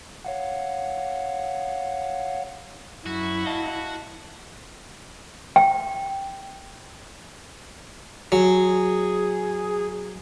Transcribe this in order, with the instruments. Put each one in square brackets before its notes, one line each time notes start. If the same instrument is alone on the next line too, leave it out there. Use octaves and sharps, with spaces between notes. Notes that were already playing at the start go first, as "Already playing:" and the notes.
[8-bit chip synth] C#5 F5 F#5
[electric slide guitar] F#2 [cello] E4 [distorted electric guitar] F#4
[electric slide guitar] D#5 F5 A5
[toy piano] G5
[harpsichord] F#3 [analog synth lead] G#4